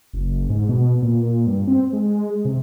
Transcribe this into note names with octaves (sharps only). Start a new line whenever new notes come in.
F#1
G#2
B2
A#2
G2
C4
G#3
C3